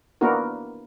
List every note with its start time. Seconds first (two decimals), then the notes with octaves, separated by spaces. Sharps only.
0.21 A#3 B3 D4 E4 F#4 A#4